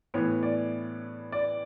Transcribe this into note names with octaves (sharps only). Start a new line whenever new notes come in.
A2 E3 B3 C#5
D5
D5